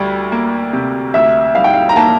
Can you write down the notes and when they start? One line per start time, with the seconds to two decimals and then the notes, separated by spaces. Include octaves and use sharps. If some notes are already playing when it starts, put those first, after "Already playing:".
Already playing: D2 G3
0.32 A#3
0.73 C3
1.14 D2 E5
1.55 G3 F5
1.64 G5
1.74 F5
1.89 A#5
1.96 A#3 A5